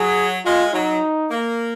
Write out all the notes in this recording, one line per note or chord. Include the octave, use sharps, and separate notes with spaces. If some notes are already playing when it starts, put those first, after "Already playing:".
Already playing: F#3 G#4
G#3 F4
F#3 D#4
A#3